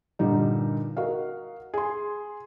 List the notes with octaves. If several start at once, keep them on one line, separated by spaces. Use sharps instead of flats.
G2 A#2 D3 G3 D#4
F#4 A#4 D#5 F5
G#4 C6